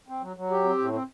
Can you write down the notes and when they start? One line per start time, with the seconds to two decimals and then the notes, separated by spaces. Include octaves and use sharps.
0.08 C4
0.22 F#3
0.36 F#3
0.51 G4
0.64 C4
0.78 A2
0.93 C4